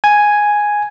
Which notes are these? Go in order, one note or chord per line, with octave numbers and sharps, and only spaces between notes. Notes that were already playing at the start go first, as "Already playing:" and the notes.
G#5